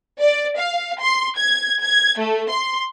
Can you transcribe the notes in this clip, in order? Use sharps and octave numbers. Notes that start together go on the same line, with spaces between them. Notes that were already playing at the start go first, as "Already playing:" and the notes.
D5
F5
C6
G#6
G#6
A3
C6